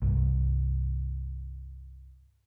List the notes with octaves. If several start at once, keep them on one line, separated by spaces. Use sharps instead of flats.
C2 G2